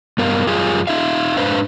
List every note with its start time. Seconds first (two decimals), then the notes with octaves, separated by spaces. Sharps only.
0.18 G2 B3 A#4 F5
0.47 F#2 G3 F4 G#4 F5 G#5
0.87 D#4 E5 F5
1.37 G#2 D4 B4 C5 F5